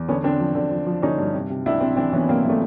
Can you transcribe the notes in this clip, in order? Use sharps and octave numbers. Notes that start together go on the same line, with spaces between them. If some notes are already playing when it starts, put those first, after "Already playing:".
Already playing: E2
D3 B3 C#4
D3 C4 D4
F3
D3
F3
F3
D3 C#4 D#4
G2
C3
C3
C#2 D4 E4
C3 C4 D4
E3 C4 D4
E3 B3 C#4
C3 A#3 C4
E3 A3 B3